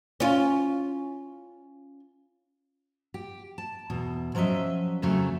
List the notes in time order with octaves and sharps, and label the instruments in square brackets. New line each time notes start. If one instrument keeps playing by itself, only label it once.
[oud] C#4 F4
[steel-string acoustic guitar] G4
A5
E2 B2
F3 F#3 C#4 D#5 E5
F2 C#3 F#3 A3